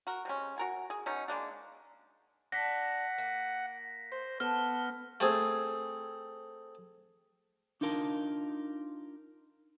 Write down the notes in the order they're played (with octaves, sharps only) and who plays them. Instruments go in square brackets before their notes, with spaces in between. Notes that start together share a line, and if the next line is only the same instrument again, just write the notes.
[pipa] F#4 A#4
C3 G#3 C#4
F#4 A#4 G#5
G#4
B2 C#4 D#4
G#3 A#3 D4
[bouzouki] D4 [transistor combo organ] F#5 [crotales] A#6 B6
[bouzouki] A#3
[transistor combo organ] C5
[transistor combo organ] B3 [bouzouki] A4 [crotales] F6
[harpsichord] A3 C4 G#4
[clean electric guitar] D4 D#4 F4 A#4 A5